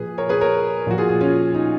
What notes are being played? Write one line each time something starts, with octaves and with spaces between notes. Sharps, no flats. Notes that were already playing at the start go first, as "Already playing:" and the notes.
Already playing: A#2 F3 G#4 B4
A#4 C#5
G#4 B4
A#4 C#5
A#2 F3 F#4
F4 G#4
F4 G#4
C#4 F4
D#4